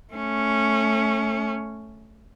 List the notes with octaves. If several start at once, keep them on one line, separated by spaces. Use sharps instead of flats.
A3 C#4